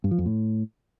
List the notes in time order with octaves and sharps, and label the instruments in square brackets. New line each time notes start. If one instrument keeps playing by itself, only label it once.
[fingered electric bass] G2
F3
F2
A2